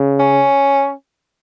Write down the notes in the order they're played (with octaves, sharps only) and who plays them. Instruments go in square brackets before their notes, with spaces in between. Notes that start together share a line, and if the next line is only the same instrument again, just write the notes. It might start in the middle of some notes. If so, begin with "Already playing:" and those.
Already playing: [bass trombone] C#3
[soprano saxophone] C#4